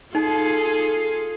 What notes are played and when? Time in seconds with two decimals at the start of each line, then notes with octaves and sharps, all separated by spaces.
0.15 D#4 F4 G#4 A4